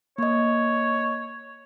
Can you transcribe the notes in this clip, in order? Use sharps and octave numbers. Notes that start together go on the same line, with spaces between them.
A#3 C#5 D#5